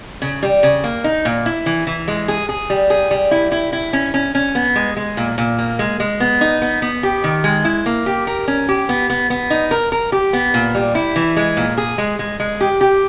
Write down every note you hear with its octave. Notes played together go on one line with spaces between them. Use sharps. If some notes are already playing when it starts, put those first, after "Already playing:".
C#3
G3
C#3
A#3
D#4
A#2
E4
E3
E3
G#3
G#4
G#4
G3
G#4
G3
E4
E4
E4
C#4
C#4
C#4
B3
G#3
G#3
A#2
A#2
A#3
G#3
G#3
B3
D#4
B3
B3
G4
D#3
G#3
E4
A#3
G4
A#4
C#4
G4
B3
B3
B3
D#4
A#4
A#4
G4
B3
A#2
G3
E4
E3
G#3
A#2
G#4
G#3
G#3
G#3
G4
G4